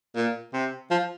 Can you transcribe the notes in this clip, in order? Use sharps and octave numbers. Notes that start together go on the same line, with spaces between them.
A#2
C3
F3